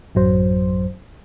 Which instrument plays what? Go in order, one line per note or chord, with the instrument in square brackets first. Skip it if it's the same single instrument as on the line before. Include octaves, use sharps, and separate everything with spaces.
[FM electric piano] A1 F#2 F#3 C5